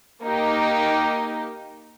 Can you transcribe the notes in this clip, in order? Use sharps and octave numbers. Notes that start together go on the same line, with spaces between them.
A#3 D#4 G4